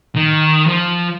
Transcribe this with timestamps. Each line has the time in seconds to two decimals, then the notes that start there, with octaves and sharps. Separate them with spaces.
0.16 D#3
0.67 F3